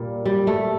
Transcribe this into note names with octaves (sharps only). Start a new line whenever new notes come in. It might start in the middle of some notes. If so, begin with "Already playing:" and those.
Already playing: A#2 G3 A#3
G3
A3